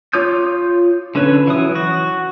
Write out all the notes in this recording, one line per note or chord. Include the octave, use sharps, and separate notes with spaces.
F4 C#5 D6 D#6 G6
D3 C#4 A4 B4 C#5
E3 F#3 D#6
F#4